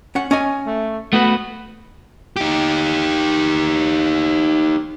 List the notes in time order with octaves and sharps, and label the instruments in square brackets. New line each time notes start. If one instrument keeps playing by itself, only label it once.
[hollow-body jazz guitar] C#4 F#5
C#4 D#5 G#5
[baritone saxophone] A3
[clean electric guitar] A3 F#4 B4 [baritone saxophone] B3
[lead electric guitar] D#4 G4